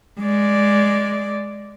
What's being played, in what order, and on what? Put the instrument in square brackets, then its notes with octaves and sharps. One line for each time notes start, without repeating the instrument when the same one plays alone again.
[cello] G#3 D5